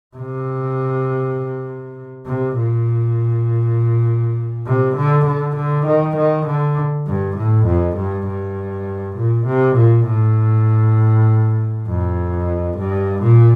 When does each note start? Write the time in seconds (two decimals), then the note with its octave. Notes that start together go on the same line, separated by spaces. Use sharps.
0.16 C3
2.26 C3
2.56 A#2
4.67 C3
4.96 D3
5.27 D3
5.57 D3
5.87 D#3
6.17 D#3
6.47 D3
7.07 G2
7.37 A2
7.67 F2
7.97 G2
8.27 G2
9.17 A#2
9.47 C3
9.77 A#2
10.07 A2
11.88 F2
12.78 G2
13.23 A#2